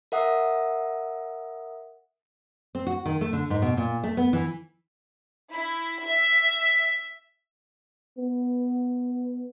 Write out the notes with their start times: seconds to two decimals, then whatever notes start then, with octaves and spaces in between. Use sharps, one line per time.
0.12 A#4 E5 F#5 D#6
2.75 C4
2.87 F#4
3.06 D#3
3.21 A3
3.33 D3
3.50 G#2
3.62 B2
3.77 A#2
4.04 A3
4.17 B3
4.33 E3
5.51 E4
6.04 E5
8.18 B3